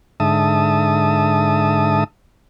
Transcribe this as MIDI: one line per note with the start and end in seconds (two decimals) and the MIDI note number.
0.20 2.04 44
0.20 2.04 50
0.20 2.04 76
0.20 2.04 81
0.20 2.04 87